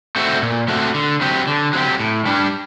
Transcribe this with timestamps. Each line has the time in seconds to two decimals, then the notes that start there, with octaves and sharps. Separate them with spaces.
0.16 A3 C4 F#4
0.42 A#2
0.68 A3 C4 F#4
0.94 D3
1.21 F#3 C4 G4
1.47 D3
1.73 F#3 C4 G4
2.00 A2
2.25 G3 D4